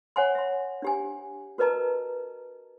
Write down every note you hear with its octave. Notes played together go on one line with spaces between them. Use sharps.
C#5 F#5 G#5 C6
E5 C6
D4 G4 G#5
F#4 A#4 B4 D#5 A5 A#5